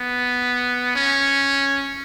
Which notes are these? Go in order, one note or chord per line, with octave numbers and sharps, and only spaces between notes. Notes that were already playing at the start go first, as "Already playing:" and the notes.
Already playing: B3
C#4